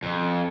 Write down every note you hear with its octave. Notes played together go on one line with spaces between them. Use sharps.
F2